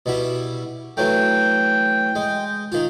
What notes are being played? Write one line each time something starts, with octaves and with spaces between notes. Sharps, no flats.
B2 G3 E4
E3 F#3 A3 G5
G#3
D#3 F4